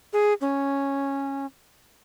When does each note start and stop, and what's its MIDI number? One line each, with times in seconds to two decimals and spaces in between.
0.13 0.33 68
0.41 1.46 61